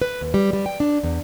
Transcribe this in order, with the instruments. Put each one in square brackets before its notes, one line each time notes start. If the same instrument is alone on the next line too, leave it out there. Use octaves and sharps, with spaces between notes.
[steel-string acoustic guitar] B4
D#2
G3
G3
G5
D4
E2